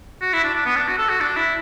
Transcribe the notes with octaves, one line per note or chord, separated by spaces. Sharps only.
F#4
E4
D4
D4
B3
D4
F#4
A4
F#4
D4
E4